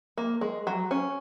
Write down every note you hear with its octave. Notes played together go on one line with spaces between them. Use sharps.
A#3
G#3
F#3
C#4